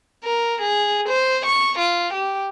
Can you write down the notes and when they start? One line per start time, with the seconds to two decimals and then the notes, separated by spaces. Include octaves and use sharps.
0.24 A#4
0.61 G#4
1.09 C5
1.46 C#6
1.79 F4
2.14 G4